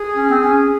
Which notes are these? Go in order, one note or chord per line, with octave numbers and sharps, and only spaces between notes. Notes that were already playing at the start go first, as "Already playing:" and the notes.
Already playing: G#4
C#4
C4
C#4